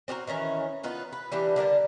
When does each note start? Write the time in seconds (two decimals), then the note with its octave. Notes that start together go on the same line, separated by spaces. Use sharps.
0.08 C4 D4 F#4 A#4
0.27 D#3 E3 C#4 A#4
0.83 B3 D#4 F4 B4
1.13 B4
1.32 E3 G3 B3 D4
1.56 D3 G3 A#4 A5